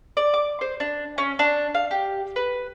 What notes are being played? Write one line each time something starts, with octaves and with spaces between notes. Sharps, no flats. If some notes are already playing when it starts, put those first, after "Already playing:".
D5
D6
C5
D4
C#4
D4
F5
G4
B4